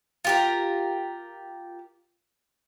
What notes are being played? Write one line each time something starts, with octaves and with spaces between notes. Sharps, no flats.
F4 G4 A#4